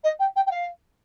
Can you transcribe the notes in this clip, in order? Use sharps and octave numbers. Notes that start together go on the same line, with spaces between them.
D#5
G5
G5
G5
F5